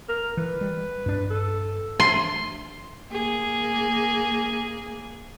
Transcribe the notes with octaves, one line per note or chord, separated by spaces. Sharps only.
A#4
E3 B4
G3
G2 D4
A4
C6
A#3 G#4